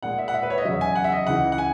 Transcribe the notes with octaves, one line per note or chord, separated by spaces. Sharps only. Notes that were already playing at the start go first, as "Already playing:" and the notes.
A#2 G#3 F#5
E5
F#5
E5
B4
C#5
D#5
E2 C#3 F#3 E5
G#5
F#5
E5
D#5
C#2 C#3 E3 F#5
F#5
G#5